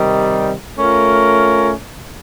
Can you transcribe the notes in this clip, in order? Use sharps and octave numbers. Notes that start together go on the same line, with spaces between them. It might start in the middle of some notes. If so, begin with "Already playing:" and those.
Already playing: C3 D#3 G3
A3 C#4 F4 A#4